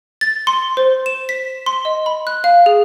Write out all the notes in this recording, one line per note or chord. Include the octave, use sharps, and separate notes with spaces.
A6
C6
C5
E7
B6
C6
D#5
B5
F#6
F5
G#4